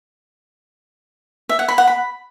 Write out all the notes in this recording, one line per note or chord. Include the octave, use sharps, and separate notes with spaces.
E5
F#5
B5
F#5
B5